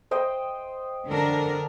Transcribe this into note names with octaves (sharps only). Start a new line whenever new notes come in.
C5 D#5 G5
D3 D4 A#4